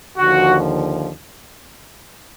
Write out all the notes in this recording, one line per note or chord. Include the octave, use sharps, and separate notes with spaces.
D#2 D3 F3 F#4